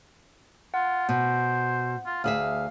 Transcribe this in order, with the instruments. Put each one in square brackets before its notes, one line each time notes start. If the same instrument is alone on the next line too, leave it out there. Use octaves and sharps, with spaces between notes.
[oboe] F4 [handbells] F#5
[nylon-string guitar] B2 [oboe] C5
[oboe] F4
[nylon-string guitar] D2 G#4 E5 [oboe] F5